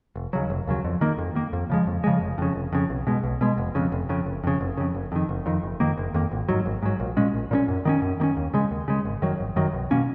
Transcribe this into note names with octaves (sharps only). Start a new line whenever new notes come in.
F1
D#2 C#3 F#3
F1
D#2 C#3 F#3
F2
D#3 A#3
F2
D#3 A#3
F2
C#3 F3 G#3
F2
C#3 F3 G#3
F1
F2 C#3
F1
F2 C#3
B1
B2 G#3
B1
B2 G#3
F1
F2 C#3
F1
F2 C#3
F#1
F2 C#3
F#1
F2 C#3
F#1
F2 D#3
F#1
F2 D#3
F#1
F2 D#3 A#3
F#1
F2 D#3 A#3
G#1
G#2 F#3
G#1
G#2 F#3
A#1
A#2 G#3 C#4
A#1
A#2 G#3 C#4
F#2
D#3 A#3 C#4
F#2
D#3 A#3 C#4
D#2
C#3 G#3
D#2
C#3 G#3
G#1
F#2 D#3 F#3
G#1
F#2 D#3 F#3
B1
B2 A#3 C#4